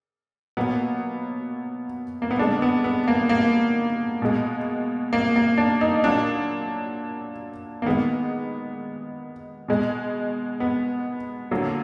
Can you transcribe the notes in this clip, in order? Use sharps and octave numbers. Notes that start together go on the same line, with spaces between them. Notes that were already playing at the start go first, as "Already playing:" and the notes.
B2 F#3 A#3 B3
A#3
B3
D3 G#3 D4
B3
B3
A#3
A#3
B2 G#3
A#3
A#3
D4
D#4
A#2 F#3 A#3 D4
A#3
D#3 G#3 B3
B2 G#3
B3
D3 F#3 A#3